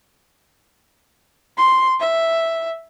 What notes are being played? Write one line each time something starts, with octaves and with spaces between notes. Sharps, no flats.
C6
E5